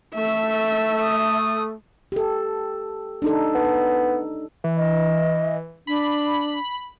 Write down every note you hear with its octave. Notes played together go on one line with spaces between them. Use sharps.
A3 E5
D#6
G4 A4
D4 D#4 A4
B3
E3
D#5
D4 B5